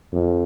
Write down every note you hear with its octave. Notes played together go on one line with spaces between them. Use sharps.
F2